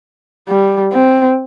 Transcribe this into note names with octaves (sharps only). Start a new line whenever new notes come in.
G3
C4